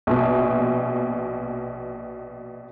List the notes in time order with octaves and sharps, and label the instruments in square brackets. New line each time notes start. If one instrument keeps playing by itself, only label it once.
[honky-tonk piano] A#1 B2